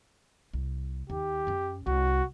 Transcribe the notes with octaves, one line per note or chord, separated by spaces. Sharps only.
C2
D#2 G4
F#2 C#4
C2 F#4